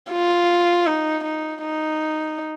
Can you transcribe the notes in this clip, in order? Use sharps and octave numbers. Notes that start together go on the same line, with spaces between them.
F4
D#4
D#4
D#4